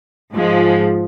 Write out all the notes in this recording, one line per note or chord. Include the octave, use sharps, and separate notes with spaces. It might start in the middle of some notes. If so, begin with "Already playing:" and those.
G#2 F3 G#3